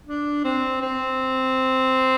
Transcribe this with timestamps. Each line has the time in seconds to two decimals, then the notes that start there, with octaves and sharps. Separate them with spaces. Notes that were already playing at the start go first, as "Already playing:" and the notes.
0.07 D4
0.45 C4
0.82 C4